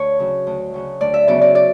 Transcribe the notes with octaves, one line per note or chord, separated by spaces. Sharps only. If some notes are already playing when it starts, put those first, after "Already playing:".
Already playing: D2 C#5
C#3 F#3
D2
C#3 F#3
D2 D5
E5
C#3 F#3 B3 D5
D5
D5